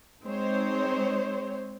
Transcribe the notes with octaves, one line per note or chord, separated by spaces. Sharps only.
G#3 C4 D#4 C5 C#5